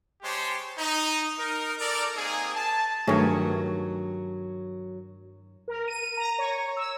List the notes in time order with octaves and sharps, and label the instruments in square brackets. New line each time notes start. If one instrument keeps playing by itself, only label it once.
[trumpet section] G#3 G4 C5 C#5 A5 C6
D#4
D#4 A#4
A4 A#4 D5
A#3 C4 D#4 G#4
A5
[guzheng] G2 D#3 [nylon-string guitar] F#3 [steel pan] A3 G#4 C#5
[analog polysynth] A#4
D#7
A#5
C#5
E6